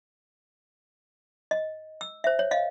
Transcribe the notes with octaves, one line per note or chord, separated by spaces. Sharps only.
D#5
E6
C5 E5
C#5
D#5 F5